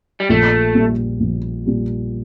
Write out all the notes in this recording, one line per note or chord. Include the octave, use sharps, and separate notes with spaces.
G3
A#1 A3
A#2 G3
A#1
A#2 G3